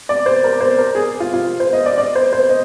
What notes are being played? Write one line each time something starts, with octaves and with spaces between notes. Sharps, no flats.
D5
C5
A#4
C5
A#4
G#4
F4
F4
C5
D#5
D5
D5
C5
C5
D#5